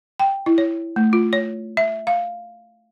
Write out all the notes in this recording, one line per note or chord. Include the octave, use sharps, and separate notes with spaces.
G5
E4
C#5
A3
F4
C#5
E5
F5